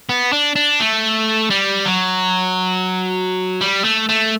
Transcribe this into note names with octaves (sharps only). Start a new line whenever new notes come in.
B3
D4
D4
A3
G3
F#3
G3
A3
A3